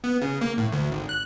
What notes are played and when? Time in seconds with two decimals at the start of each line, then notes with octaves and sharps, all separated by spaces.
0.04 B3
0.22 C#3
0.41 A#3
0.58 A2
0.73 D2
0.91 G#1
1.09 F#6